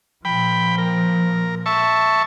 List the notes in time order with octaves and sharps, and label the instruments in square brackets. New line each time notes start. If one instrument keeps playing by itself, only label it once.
[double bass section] A#2 F3 [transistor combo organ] G5 B5
[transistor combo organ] A#4
E5 A5 C#6